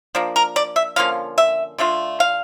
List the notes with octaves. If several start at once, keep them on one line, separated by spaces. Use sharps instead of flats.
F3 A#3 D4
A#4
D5
E5
D3 F3 A#3 C#4 F5
E5
D3 A3 D4 F4
F5